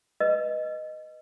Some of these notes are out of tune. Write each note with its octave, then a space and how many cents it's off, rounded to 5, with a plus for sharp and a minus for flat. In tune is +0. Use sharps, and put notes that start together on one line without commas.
B4 -5 D#5 -5